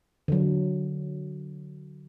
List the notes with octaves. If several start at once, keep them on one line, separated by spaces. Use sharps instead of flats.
D3 F#3